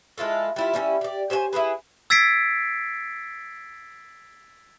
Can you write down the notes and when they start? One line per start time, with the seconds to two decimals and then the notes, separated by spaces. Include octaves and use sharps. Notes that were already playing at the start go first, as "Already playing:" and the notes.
0.18 G#3 E4 F4 A4
0.56 G3 E4 F4
0.73 G3 C#4 D#4 E4
1.01 G4 D5
1.30 G4 C5 C#5 G#5
1.53 E4 G4 G#4 B4
2.10 E6 G#6 A6 B6 C7 D7